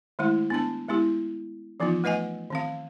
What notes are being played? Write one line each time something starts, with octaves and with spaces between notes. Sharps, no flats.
D#3 G#3 A3 E4
B3 D4 A5
G#3 B3 E4 G4
E3 F3 B3 D#4 F4
A3 B4 D#5 F#5 G#5
D#3 C4 F5